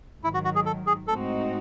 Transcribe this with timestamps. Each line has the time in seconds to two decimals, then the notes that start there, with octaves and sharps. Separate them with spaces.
0.23 G#2 D#3 F#3 E4
0.34 F#4
0.45 F#4
0.55 G#4
0.66 A4
0.87 G#4
1.08 A2 G#3 C4 D#4 F#4 A4